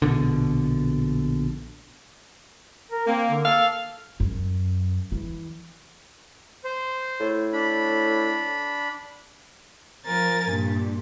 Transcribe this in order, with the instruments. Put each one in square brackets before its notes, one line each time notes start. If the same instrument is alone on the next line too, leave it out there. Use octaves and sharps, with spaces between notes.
[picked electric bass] A#1 B2 D3
[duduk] A#4
[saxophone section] A#3 [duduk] C4
[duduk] D3
[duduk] A#3 [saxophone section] A4 F5
[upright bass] F#2
E3
[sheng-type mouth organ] C5
[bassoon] A2
[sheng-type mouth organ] D4 B5
[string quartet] F3 A#4 G#5 A6
G2 A#2